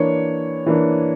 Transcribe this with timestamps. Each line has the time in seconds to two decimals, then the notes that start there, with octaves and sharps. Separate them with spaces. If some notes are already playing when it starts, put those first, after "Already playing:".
Already playing: E3 A#3 D4 C#5
0.66 E3 A#3 D4